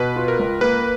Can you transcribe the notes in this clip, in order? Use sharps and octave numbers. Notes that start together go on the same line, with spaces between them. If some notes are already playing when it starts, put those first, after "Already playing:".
Already playing: B2 B4
F4
A#4
C#2
A#3 B4